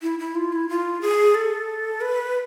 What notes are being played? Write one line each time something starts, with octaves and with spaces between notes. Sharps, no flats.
E4
E4
F4
E4
F4
G#4
A4
B4